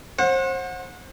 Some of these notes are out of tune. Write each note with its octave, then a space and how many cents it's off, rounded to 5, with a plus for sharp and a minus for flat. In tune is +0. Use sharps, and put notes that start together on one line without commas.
C5 +30 F#5 -25